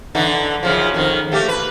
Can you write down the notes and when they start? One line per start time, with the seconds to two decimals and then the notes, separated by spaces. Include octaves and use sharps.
0.15 D3 E3 D#4
0.63 F#2 C#3 F3
0.94 F2 D#3
1.32 A3 A#3 G4
1.48 B4